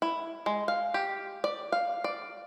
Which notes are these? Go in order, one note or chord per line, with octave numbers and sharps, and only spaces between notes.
E4
G#3
F5
G4
D5
F5
D5